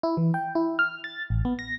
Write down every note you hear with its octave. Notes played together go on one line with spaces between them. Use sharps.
E4
E3
G5
E4
F6
A6
A1
B3
A#6